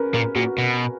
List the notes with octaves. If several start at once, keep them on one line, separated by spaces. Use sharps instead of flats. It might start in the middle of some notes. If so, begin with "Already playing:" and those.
Already playing: C#4 A#4 B4
A#2 A#4
A#2 F#4
B2